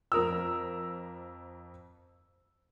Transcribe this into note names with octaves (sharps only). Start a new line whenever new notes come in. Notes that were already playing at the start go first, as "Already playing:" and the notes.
F2 A#4 E6